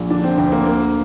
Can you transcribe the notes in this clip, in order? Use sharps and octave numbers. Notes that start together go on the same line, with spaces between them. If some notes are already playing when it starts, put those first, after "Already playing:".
Already playing: A#1 A#2
D3 D4
C4
D2 C4
A#3
D3 A#3